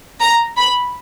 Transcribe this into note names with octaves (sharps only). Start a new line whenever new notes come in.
A#5
B5